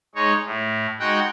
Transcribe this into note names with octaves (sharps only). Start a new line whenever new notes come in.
G#3 D#4 C#5
A2
G#3 D#4 F#4 F#5 G5